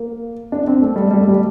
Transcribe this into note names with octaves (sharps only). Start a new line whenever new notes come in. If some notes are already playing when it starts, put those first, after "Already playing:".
Already playing: A#3
D4
C4
A3
G3
G3
A3
G3